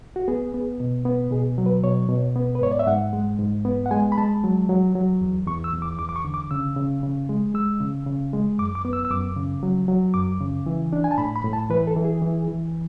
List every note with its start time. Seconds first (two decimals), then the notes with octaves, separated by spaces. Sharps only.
0.16 F#4
0.28 B3 G#4
0.54 B3
0.80 B2
1.05 B3
1.31 B2 G#4
1.58 F#3
1.66 B4
1.84 B2 C#5
2.09 B2
2.36 B3
2.55 B4
2.61 G#2 C#5
2.71 D5
2.79 E5
2.87 G#2 F#5
3.13 G#3
3.39 G#2
3.65 B3
3.86 F#5
3.91 G#3 G#5
4.12 B5
4.18 G#3 A5
4.44 F#3
4.69 F#3
4.95 F#3
5.21 E2
5.46 E2 C#6
5.64 E6
5.73 E2
5.82 D6
5.99 E2 D6
6.09 D6
6.16 C#6
6.25 D3
6.34 D6
6.51 C#3 E6
6.76 C#3
7.03 C#3
7.29 G#3
7.54 G#3 E6
7.80 C#3
8.06 C#3
8.33 G#3
8.59 F#2 D6
8.75 D6
8.85 B3
8.93 E6
9.05 E6
9.11 F#2 D6
9.37 C#3
9.63 F#3
9.88 F#3
10.14 F#2 D6
10.41 C#3
10.66 E3
10.93 D4
11.04 G#5
11.11 A5
11.18 A2 B5
11.36 B5
11.44 A2
11.53 A5
11.70 E3 B4
11.87 A4
11.96 E3
12.05 G#4
12.22 E3
12.48 E3